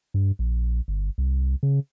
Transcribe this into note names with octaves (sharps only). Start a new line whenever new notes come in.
G2
A#1
G1
C2
C#3